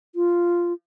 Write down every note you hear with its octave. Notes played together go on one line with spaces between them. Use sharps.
F4